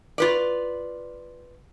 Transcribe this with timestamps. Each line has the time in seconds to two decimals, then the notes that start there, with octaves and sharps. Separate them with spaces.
0.18 F4 B4 D5